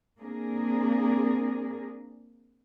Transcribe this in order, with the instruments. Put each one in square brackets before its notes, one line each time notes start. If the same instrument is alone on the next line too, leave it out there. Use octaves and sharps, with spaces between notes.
[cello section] A#3 C4 D4 G#4 A#4